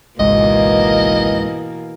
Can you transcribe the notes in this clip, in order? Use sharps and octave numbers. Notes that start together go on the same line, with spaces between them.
G#1 C#2 G#2 B2 E3 A#3 D#5